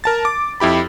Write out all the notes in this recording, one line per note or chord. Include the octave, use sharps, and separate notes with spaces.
A#4 A5 A6
D6
F2 E4 G4 B5